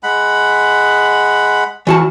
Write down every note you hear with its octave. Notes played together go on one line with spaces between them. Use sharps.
G#3 F#5 B5
E3 F#4 A5